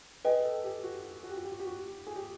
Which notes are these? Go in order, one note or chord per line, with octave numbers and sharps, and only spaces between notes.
G#4 B4 D#5 G5
A4
G4
F#4
F#4
F#4
G4
F#4
G4
F#4
G4
F#4
G#4
G4